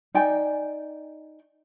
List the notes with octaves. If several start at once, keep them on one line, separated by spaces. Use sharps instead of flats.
D#4 D5 G5 G#5